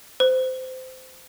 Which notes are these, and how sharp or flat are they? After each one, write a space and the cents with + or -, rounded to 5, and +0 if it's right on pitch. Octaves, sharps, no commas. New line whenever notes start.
C5 -20